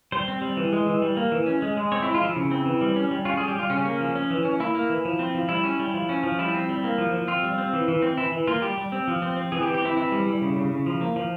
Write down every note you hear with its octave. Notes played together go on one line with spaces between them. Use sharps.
G3 C5
C4
G3
E3
G#3
E3
G3
A#3
E3
C#4
G#3
G#3
C4 C#5
G#3 E4
F4
F3 E4
C#3
C4
E3
G3
C#4
G3
C#4 F4
G3 G#4
G4
G3 F4
C#3 C#4
A#3
F3
C#4
E3
C#4
A#3 E4
A#3
E3
F3
C4
F3
G3 E4
C#4
G3
F3
C#4
F3
G3 E4
C4
G3
A#3
F3
F3
C4 F4
G3
C4
E3
E3
C4
E3 E4
E3
A#3 F4
G3 G4
G3
C4
F3
C4
C4
E3 G#4
G4
E3
G4
C4 E4
E3 E4
G3
G3
C#3
C#3
C#3
F3
A#3
F3